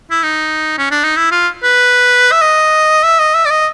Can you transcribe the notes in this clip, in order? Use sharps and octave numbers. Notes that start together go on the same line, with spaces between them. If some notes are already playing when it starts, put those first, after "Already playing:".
E4
D#4
C#4
D4
D#4
E4
F4
B4
E5
D#5
E5
D#5
E5
D5
D#5